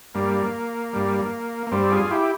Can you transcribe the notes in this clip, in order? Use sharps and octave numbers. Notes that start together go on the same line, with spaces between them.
G2 G3 A#3
G2 G3
A#3
G2 G3 C4
F4 G#4
E4 G4